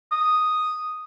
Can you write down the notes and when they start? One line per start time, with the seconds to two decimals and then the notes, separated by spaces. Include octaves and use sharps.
0.12 D#6